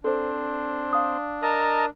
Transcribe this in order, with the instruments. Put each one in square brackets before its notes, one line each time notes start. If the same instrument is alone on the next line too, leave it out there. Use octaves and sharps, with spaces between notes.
[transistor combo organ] C4 [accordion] D4 [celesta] A4 C5
[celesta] F5 D#6
[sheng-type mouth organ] A#4 A5 [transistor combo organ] D#5 A#5